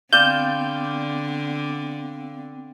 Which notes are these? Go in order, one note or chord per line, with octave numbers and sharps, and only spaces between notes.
D3 B3 C4 D5 F5 G5 G6